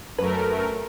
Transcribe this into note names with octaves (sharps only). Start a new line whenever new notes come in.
F#2 A3 A#4 B4